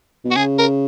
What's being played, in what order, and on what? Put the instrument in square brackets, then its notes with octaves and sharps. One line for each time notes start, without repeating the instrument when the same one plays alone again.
[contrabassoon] B2
[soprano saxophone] F#4
[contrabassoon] C#3 [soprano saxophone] G#4
[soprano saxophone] A#4